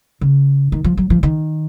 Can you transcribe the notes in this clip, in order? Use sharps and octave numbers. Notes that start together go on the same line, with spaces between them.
C#3
D#3
F3
F#3
F3
D#3